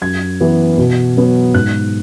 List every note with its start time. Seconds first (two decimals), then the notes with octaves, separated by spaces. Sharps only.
0.01 F#2 G#6
0.40 E3 B3
0.78 B2
1.17 F#3 B3
1.54 G#2 F#6